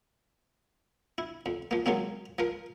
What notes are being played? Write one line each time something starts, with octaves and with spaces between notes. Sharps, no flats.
E4
F2
F3 A#3
D#3 F#3 G#3 A#3 C4
F3 A#4